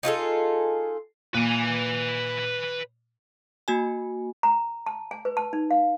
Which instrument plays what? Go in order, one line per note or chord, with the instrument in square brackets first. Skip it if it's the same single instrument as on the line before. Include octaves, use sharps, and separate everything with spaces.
[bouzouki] D#4 F4 G#4 A4
[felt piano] A#2 [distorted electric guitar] B4 G#5
[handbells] A#3 F#4 G#5
[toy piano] A#5
A5
G#5
B4
A5
D#4
F5